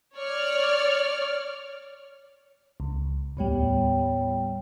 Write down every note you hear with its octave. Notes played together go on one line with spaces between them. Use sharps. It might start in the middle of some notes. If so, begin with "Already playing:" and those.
C#5 D5 F6
C#2
D#2 A2 G3 B3 C#5 G5